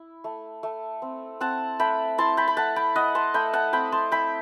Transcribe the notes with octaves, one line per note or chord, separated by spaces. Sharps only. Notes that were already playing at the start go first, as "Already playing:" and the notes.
Already playing: E4
A3
A3
C4
C4 F#5 A5
A3 G5 B5
E4 A5 C6
G5 B5
B5
A3 F#5 A5
G5 B5
E4 D#5 F#5
A5 C6
A3 G5 B5
F#5 A5
C4 G5 B5
A5 C6
E4 G5 B5